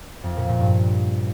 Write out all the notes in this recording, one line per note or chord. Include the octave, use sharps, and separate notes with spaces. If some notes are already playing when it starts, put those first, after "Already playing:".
F2
A#2
A#2
G2